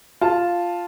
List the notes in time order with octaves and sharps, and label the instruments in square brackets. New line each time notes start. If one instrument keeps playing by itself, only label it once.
[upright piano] F4 A5